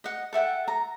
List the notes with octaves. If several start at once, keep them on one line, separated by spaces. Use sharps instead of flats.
D#5 F#5
A4 E5 F#5 G5
A#5